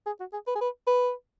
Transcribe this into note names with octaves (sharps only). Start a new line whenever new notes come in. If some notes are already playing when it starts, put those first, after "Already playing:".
G#4
F#4
G#4
B4
G#4
B4
B4